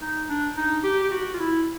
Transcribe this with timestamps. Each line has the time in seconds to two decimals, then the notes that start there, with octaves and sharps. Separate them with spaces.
0.01 D#4
0.29 D4
0.56 D#4
0.83 G4
1.03 G4
1.11 F#4
1.34 F4
1.39 E4